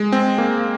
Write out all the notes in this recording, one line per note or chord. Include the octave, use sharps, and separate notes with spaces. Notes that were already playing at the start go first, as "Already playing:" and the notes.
Already playing: G#3
C4
A#3